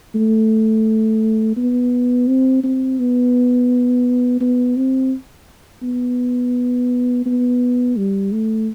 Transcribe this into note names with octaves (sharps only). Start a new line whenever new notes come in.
A3
B3
C4
C4
B3
B3
C4
B3
B3
G3
A3